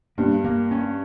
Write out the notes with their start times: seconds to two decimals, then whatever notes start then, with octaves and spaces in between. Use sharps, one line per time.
0.18 G2 A#3
0.44 A#3
0.71 C#4